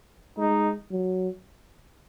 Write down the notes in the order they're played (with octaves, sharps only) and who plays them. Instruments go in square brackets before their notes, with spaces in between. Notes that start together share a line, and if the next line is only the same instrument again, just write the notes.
[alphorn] G#3 [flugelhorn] D#4
[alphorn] F#3